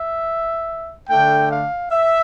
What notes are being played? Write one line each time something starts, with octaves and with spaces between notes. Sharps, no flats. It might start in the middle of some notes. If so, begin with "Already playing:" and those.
Already playing: E5
D3 A3 D4 G5
F5
E5